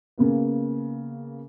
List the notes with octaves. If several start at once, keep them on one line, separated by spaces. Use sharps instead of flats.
C#3 A#3 B3